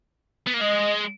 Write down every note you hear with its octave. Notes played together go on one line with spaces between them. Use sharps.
B3
A#3
G#3 D#5